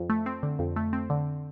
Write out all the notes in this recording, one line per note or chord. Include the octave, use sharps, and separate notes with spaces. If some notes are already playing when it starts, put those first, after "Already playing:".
Already playing: F2
A3
C4
D3
F2
A3
C4
D3